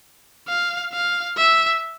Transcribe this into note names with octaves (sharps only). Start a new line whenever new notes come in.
F5
F5
E5